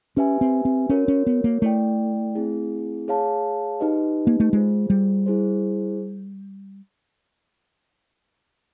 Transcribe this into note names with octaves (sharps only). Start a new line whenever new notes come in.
C#4 G4 B4 E5 G#5
C4
C4
C#4 F#4 A#4 C#5
C#4
B3
A#3
A3 E4 A4 D5 G5
C4 E4 G#4
G#4 C#5 F5 A5
D#4 G4 B4 D#5
A#3
A3
G#3 F4 G#4 C5
G3
E4 G#4 C5